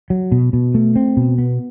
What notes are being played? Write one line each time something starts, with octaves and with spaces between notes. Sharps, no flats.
F#3
B2
B2
A3
C4
B2
B3